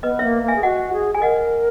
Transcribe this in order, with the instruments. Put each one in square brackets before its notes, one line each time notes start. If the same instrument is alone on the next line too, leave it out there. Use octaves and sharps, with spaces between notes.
[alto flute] B3 [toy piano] B4 D#5
[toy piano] C#5 E5
[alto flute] A#3
A#3
[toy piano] E5 G#5
[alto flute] G#4
[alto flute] F#4 [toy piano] D#5 F#5
[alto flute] G#4
[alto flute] G#4 [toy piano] G#5
[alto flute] A#4 [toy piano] D#5 F#5